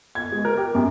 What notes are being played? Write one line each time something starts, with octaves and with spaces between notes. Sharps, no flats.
G#6
G#3
A#4
G4
F#2